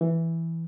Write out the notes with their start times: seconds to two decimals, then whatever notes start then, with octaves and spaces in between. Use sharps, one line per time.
0.01 E3